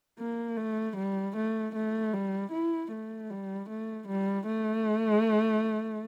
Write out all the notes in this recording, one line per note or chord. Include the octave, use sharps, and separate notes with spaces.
A#3
A3
G3
A3
A3
G3
E4
A3
G3
A3
G3
A3